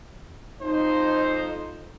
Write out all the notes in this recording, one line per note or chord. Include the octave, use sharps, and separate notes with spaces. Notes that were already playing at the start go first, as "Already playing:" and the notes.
F2 D#4 C5